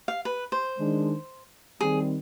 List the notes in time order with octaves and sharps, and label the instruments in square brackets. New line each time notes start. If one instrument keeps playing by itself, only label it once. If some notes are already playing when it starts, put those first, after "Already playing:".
[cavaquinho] F5
B4
C5
[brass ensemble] D#3 G#3 D4
[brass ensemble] D#3 G3 C4 [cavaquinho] G#4